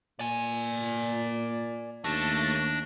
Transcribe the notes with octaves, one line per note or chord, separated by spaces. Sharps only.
A#2 D5 G#5
D#2 A3 D4 A#6